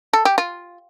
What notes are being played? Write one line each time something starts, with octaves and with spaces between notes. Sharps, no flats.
A4
G4
F4